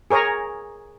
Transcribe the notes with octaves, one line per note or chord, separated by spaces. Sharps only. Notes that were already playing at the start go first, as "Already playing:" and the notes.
G#4 A#4 C#5 G#5 A#5